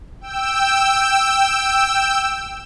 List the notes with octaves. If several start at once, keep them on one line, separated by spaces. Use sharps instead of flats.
G5 E6